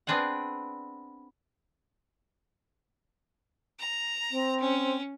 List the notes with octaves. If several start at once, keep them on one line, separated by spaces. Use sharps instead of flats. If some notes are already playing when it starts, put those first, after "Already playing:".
B3 C4 D4 G#4 F#5
A#5
C4
C#4